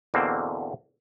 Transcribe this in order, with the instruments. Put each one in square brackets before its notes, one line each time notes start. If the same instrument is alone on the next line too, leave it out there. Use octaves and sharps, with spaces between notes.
[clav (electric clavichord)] E2 B2 D3 A#3 C4